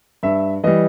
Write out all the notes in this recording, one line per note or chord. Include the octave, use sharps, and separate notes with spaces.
G2 E5
E3 G3 D#5